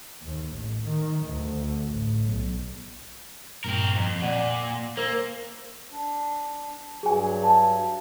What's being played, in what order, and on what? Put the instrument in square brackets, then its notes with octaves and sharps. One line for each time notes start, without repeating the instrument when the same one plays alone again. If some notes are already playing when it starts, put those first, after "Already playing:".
[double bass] D#2
A1
D#3
D2
A1
B1
[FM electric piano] G2 A#2 [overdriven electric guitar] C4 A#4
[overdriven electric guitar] F2
[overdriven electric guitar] A#2 [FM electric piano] D5 F#5
[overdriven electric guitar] A#3 [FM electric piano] A#4 C5 E6
[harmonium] D4
[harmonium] G2 F#3 [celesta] G#4 G#5
[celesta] A5